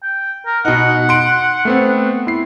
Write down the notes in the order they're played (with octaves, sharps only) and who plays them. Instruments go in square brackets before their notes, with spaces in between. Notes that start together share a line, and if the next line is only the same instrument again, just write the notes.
[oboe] G5
A#4
[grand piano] B2 D#4 [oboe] F#5
[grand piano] C6 D7
[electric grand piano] A3 B3 C4
E4 C7